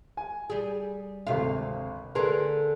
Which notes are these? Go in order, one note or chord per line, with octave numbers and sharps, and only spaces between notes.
G#5
G3 G#4
G#1 D2 C3 F5
D3 G#4 A#4 B4 C6